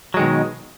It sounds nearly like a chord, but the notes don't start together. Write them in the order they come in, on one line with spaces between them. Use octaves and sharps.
F#3 G#3 D#3 B2